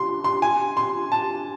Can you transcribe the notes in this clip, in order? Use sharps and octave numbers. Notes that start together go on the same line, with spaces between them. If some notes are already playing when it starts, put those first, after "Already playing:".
Already playing: C6
C6
G#5
C6
A5